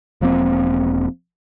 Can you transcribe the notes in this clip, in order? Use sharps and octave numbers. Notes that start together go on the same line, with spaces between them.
E1 F3 A#3 C4